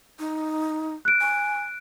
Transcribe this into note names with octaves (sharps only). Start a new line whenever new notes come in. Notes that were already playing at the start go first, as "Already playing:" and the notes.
D#4
F#6 D7
G#5